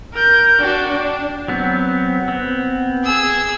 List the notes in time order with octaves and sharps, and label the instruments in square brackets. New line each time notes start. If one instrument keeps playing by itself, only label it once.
[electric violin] A#4 G6
[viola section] D4 F#4 [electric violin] G5
[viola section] D4
[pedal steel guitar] F#3 B3 C4
B3 C4
[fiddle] G#4 E6